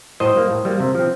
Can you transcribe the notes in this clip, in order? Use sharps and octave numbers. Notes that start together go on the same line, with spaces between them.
A2 C5 D#5
G3 A#3
A2
G3 A#3
C3
F3 C4